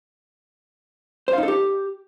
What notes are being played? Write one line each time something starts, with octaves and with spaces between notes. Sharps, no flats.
C5
F5
D#4
A4
G4